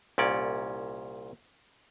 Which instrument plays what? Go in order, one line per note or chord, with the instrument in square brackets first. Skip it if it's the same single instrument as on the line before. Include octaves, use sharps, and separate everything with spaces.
[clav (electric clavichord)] C2 A#2 C#4 D5